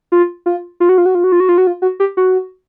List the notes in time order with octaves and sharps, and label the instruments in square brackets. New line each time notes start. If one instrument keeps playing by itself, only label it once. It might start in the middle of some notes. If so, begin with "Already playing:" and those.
[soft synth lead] F4
F4
F4
F#4
F4
F#4
F4
F#4
F4
F#4
F4
F#4
F4
F#4
G4
F#4